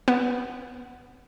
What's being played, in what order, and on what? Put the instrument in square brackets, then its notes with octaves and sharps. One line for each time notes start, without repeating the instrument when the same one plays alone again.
[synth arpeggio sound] B3